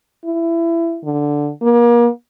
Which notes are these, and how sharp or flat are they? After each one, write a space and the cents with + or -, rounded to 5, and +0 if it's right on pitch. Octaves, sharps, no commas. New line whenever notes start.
E4 +20
D3 +0
A#3 +35